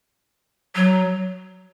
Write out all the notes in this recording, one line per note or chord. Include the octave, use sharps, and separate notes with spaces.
F#3